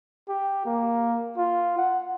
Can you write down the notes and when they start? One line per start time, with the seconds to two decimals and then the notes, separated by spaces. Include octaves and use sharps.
0.28 G4
0.66 A#3
1.37 F4
1.78 F#5